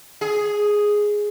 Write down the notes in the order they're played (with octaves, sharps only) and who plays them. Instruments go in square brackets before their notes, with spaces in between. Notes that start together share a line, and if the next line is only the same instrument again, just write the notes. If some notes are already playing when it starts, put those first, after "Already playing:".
[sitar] G#4